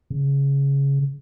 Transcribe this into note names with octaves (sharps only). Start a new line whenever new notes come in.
C#3